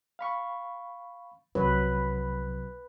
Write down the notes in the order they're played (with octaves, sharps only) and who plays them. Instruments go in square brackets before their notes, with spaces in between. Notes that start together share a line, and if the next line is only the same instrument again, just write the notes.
[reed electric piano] F5 B5 C#6
[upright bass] C2 F3 [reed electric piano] C3 F#3 [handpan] B4